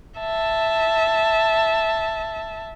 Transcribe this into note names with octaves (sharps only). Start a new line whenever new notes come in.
E5 A5